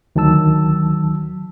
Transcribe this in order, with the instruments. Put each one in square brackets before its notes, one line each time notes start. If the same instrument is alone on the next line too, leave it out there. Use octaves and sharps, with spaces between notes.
[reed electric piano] D2 D#3 F#3 A5 E6